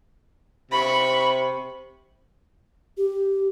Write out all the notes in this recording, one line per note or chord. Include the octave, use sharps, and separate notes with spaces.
C3 B5 C#6
G4